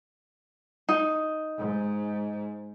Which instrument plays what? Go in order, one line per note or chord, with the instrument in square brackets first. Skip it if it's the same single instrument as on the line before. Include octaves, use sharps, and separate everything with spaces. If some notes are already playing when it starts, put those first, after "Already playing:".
[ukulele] D#4
[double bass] G#2